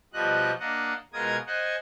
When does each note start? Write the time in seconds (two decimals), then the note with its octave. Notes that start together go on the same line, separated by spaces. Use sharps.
0.13 B2 F3 G3 D#5 F#6
0.60 A#3 D4 D#5 F#5
1.13 B2 G#3 F4 A#4 D#6 G#6
1.47 C5 D#5 F#5 G#5